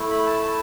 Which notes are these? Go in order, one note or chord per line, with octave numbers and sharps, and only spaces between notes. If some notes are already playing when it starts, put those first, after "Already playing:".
Already playing: A3 E4
B5
A5
A5